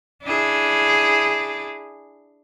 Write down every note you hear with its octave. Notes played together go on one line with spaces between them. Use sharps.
D4 E4 G#4